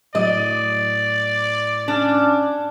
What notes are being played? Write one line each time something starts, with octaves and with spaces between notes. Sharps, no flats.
A2 F#3 D5 D#5
C#4 D4